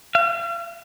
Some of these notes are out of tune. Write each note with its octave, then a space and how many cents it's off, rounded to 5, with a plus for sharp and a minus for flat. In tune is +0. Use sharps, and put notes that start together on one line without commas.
F5 -45